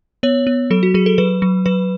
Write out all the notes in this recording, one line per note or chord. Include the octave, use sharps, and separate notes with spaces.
B3 C#5
B3
F#3 A4
F#4
F#3 G#4
A4
F#3 B4
F#3
F#3 B4